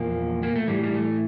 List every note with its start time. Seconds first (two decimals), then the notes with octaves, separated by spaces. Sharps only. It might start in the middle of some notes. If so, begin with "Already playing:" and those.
Already playing: E2 A#2 F3 A#3
0.43 A#3
0.56 A3
0.68 A2 E3 G3
0.84 G3
0.94 A3